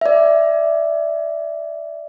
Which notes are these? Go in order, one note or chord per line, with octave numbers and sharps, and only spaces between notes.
D5 E5